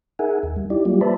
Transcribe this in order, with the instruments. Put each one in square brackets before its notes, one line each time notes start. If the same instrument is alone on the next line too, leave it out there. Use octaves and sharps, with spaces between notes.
[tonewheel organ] D#4 G#4 A#4 E5 F#5 G#5
D#2
G3
D#4 E4 G4 D5
F#3 G3 A#3 F4 G4
B4 C5 D5 E5 A5 B5